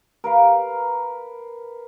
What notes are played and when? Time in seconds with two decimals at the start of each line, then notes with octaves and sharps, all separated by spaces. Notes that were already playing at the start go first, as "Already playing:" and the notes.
0.24 A#4 B4 F5